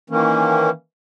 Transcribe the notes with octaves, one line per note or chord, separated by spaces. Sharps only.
D#3 E3 A#3 C#4